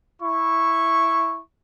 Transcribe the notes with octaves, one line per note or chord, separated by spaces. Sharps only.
E4 C#6